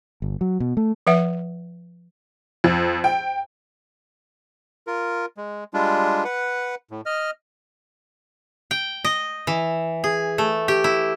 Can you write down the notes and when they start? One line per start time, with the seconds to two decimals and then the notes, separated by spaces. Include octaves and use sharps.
0.22 G1
0.41 F#3
0.60 B2
0.77 A3
1.07 F3 B4 E5 F#5
2.64 F2
3.04 G5
4.87 F4 A#4
5.37 G#3
5.74 G3 G#3 D4 F4
6.24 B4 F#5
6.91 A2
7.06 D#5 F6
8.71 G5
9.04 D#5
9.47 E3
10.04 G#4
10.38 A3
10.68 G4
10.84 E4